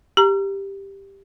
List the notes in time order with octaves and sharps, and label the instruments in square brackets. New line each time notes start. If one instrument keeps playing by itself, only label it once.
[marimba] G4 A#5